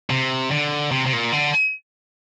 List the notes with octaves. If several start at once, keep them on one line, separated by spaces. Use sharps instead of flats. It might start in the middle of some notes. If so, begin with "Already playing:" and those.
C3
D3
C3
C3
A#2
D3